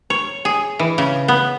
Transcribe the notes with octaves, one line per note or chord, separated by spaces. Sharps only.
C#5
G#4
E3
C#3
B3